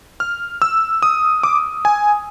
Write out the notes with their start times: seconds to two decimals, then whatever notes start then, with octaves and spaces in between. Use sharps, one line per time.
0.20 F6
0.62 E6
1.02 D#6
1.43 D6
1.85 G#5